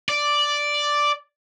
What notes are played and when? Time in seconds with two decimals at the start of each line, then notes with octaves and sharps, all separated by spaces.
0.09 D5